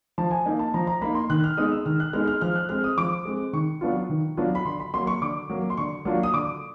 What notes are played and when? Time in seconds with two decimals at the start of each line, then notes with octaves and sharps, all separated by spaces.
0.18 F3 A5
0.31 G#5
0.46 A#3 D#4
0.59 A5
0.74 F3 A#5
0.87 A#5
1.01 A#3 D#4 B5
1.15 C6
1.30 D#3 F#6
1.44 F6
1.57 G#3 B3 D#4 D#6
1.72 E6
1.86 D#3 F6
2.00 F#6
2.13 G#3 B3 D#4 F6
2.28 F6
2.41 F3 F6
2.56 F#6
2.69 G#3 C4 F6
2.84 D#6
2.98 F3 D6
3.25 G#3 C4
3.53 D#3 C#6
3.81 F#3 B3 D4 F4
4.09 D#3
4.37 F#3 B3 D4 F4
4.55 B5
4.65 D3 C6
4.80 B5
4.94 F#3 A#3 C6
5.07 C#6
5.21 D3 D6
5.50 F#3 A#3
5.70 C6
5.77 D3 C#6
6.05 F#3 A#3 D4 F4
6.23 D#6
6.34 D3 D6